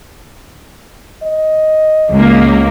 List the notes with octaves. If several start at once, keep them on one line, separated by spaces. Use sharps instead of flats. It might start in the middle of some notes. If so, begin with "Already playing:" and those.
D#5
C#2 A#3